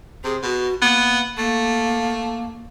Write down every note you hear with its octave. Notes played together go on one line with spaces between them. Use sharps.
C3 G#4
B2 F#4
A#3 B3
A3 A#3